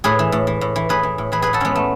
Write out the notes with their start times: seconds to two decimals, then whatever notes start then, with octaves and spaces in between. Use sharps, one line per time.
0.04 A2 G#4 B4
0.19 E3
0.32 A2
0.47 E3
0.61 A2
0.76 E3
0.89 A2 G#4 B4
1.03 E3
1.18 A2
1.32 E3 G#4 B4
1.42 A2 G#4 B4
1.53 F#4 A4
1.60 E3 G#3 B3 C#4
1.76 A3